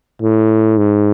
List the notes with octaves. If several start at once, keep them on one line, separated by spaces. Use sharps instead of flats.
A2
G#2